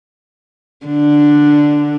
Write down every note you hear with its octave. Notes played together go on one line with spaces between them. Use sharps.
D3 D4